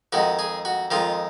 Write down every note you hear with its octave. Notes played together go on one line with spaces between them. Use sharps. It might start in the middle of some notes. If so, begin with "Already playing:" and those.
F2 D#3 G#3 F#4
G#4
F#4
F2 D#3 G#3 F4